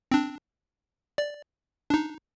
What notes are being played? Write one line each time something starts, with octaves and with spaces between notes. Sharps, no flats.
C4 D4
D5
D4 D#4